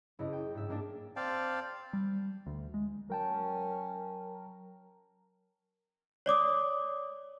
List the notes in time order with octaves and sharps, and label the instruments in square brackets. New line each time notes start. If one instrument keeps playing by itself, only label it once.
[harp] F#1 E4 D#5
G5
G#2 D4 E5
G#2 A#3 D4
[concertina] C4 D5 F5 G5 A5
[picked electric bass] G3
D2
G#3
[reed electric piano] F#3 G5 A5 [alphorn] C#4 [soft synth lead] A#4
[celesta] C#5 D5 D6 D#6